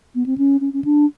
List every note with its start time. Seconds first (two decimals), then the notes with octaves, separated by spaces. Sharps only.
0.15 B3
0.26 C4
0.38 C#4
0.61 C#4
0.73 C#4
0.84 D4